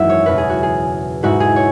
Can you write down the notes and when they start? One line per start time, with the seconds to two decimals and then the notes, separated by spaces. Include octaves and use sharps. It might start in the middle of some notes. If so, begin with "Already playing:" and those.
Already playing: G#1 F#2 E3 B3 E5 F#5
0.09 C#5
0.25 F#1 E2 B2 B4
0.38 G#4
0.50 F#4
0.63 G#4
1.23 G#2 G#3 E4 F#4
1.40 G#4
1.56 C#5